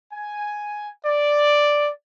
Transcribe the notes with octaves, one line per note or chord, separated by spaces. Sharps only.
G#5
D5